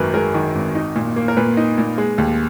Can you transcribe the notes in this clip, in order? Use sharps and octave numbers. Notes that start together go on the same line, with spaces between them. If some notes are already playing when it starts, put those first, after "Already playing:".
Already playing: G#1 F#2 D#3 A#4 B4
G#3 A#4
D#3
G#1
D#4
A#2
A#3
A#4
A#2 B4
D#4
A#2
G#3
D#2